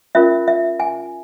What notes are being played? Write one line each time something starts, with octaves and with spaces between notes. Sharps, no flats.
C#4 F4 A#4 E5
E5
G#5